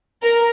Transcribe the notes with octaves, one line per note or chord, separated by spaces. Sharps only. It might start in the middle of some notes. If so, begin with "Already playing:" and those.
A#4